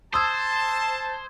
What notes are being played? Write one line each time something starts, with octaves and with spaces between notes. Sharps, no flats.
C5 A5 C6 D#6 E6 G#6